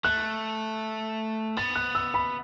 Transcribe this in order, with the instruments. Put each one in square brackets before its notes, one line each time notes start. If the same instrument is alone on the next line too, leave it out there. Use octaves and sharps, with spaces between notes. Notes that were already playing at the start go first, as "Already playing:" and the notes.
[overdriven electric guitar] A3 [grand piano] F#6
[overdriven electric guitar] B3 [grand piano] A6
[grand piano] F#6
E6
B5